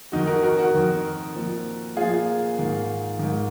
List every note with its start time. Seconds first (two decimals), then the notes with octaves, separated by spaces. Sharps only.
0.12 F2 D#3 D#4 F#4
0.27 F#4 A#4
0.43 F#4 A#4
0.58 F#4 A#4
0.74 F2 D#3
1.36 A#2 F3
1.97 A#2 F3 F4 G#4
2.59 G#2 D#3
3.19 G#2 D#3